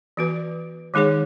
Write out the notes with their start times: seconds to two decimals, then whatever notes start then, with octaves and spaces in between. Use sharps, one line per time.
0.17 E3 B3 F#4 B4
0.94 D#3 G#3 D#4 G#4 C#5